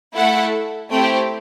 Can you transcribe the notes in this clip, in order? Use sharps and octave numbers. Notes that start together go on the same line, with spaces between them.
A3 E4 A4 F#5
A3 C4 E4 G4 G5